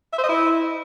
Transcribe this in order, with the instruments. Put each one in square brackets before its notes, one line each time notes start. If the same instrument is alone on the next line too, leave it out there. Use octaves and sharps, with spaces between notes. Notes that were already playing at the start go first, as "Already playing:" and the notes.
[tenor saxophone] E5
C5
D#5
E4